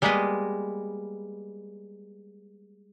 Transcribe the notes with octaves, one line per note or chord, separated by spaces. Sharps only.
G3 G#3 A#3 B3 B4 D#5